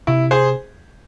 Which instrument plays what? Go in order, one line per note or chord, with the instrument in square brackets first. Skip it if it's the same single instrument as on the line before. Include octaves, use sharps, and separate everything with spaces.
[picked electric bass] C3 [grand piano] E4
[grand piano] G#4 C5